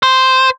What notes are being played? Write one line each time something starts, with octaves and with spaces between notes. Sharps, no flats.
C5